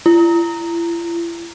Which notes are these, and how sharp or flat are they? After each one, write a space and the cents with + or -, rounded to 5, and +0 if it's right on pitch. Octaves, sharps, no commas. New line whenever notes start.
E4 +45